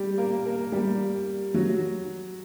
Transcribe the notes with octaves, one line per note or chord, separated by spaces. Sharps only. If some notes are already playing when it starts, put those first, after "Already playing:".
Already playing: G3 G4
A#3 A#4
A#3 A#4
G3 G4
F#3 F#4